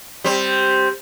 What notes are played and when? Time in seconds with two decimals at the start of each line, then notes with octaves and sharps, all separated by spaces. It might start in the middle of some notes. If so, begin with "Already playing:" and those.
0.24 G3 C4